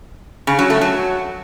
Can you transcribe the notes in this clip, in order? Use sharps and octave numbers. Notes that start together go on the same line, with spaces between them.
C#3
F#3
A3
F#3